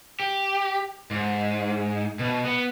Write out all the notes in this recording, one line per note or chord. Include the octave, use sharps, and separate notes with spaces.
G4
G#2
B2
B3